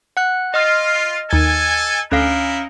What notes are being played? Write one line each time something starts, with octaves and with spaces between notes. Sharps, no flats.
F#5 F#6
F4 D#5 F6
D#2 A4 G#5 A6
D2 C#4 D#4 E4 A#4 F5